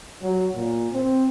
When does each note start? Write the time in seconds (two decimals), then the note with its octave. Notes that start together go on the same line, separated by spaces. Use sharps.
0.22 F#3
0.54 A#2
0.92 C4